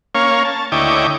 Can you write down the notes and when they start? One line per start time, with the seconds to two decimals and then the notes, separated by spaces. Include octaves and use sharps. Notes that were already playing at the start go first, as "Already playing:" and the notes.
0.15 A#3 C#4 C#5 F5
0.44 A5
0.72 D2 E4 C#5 D#5 G5 D6